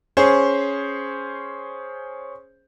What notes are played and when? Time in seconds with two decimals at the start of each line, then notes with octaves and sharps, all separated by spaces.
0.17 C#4 G#4 C5